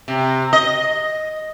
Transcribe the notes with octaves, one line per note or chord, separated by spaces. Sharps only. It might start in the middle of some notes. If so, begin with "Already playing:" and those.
C3
D#5